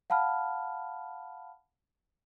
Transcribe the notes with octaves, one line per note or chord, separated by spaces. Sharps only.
F5 F#5 A5 B5 F6